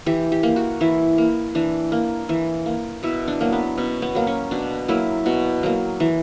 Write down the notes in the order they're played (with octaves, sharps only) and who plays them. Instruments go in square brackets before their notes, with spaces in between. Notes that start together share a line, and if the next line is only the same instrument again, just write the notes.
[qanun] E3 G4
G4
A#3
F#4
E3 E4
A#3
E3 D4
A#3
E3
A#3
B2 E4
D4
F#3 A#3
B3
B2 C#4
B3
F#3 A#3
C#4
B2 D4
F#3 A#3 E4
B2 F#4
F#3 A#3
E3